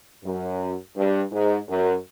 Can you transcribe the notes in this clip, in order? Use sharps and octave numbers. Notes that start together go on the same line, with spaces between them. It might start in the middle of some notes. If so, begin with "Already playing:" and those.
F#2
G2
G#2
F#2